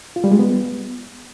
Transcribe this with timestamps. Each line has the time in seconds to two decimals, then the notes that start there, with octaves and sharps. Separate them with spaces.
0.16 F4
0.24 G3
0.32 G#3
0.39 B3